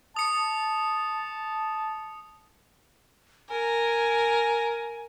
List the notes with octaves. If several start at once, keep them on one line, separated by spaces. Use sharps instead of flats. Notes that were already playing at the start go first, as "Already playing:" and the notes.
A5 D#6 C#7
A#4 G#5